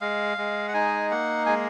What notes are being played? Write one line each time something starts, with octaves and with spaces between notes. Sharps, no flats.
G#3 F5
G#3
F#5
D#4 G#5
A#3 F#5
G#3 G#5